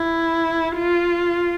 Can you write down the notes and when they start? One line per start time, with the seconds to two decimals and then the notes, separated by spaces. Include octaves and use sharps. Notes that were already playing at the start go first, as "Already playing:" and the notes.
Already playing: E4
0.77 F4